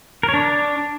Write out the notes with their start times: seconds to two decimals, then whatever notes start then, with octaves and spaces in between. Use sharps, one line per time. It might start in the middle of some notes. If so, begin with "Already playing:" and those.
0.23 A#4
0.29 C#5
0.34 D4